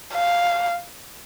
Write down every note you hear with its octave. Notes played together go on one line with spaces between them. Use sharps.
F5